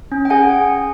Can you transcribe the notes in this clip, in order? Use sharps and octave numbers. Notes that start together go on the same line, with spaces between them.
C#4
G5
G#4 F#5 G#5